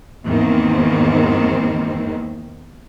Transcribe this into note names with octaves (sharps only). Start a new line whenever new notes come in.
E2 G#2 D#3 A#3 C4